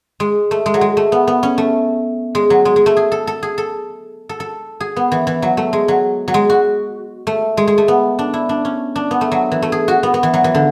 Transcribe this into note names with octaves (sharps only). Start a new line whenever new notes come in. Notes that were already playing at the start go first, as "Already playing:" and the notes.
G#3
A3
G#3
F#3
G#3
A3
B3
B3
C#4
A3
G#3
F#3
G#3
G#3
A3
G#4
A4
A4
G#4
A4
A4
A4
G#4
B3
E3
E3
F#3
A3
G#3
F#3
F#3
G#3
F#4
A3
G#3
G#3
A3
B3
D4
E4
D4
C#4
D4
B3
A3
F#3
E3
A3
G#4
F#4
B3
B3
E3
F#3
E3
D3